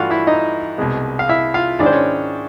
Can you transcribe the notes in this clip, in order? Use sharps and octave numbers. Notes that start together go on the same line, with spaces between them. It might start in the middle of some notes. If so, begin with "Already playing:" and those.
Already playing: G2 E3 A3 D4 F4 F#4 F5 F#5
E4 E5
D#4 D#5
C2 B2 G#3
F5
E4 E5
F4 F5
G#2 D#3 G#3 C#4 D4 E4 D5
C5
C#4 C#5